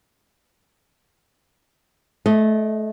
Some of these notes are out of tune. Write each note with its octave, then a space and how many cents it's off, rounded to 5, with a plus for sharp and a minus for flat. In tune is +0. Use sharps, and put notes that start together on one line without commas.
A3 -25 D#5 +0